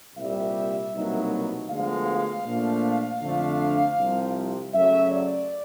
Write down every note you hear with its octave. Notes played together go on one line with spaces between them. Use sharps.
C2 A#2 G3 E5
C2 B2 F#3 A#3 D#4
D2 D3 F3 G#3 B3 F5
A#2 F3 A3 D4
F2 D3 F3 A3 D4
C2 C3 F3
F#2 C#3 F#3 A3 E5
D5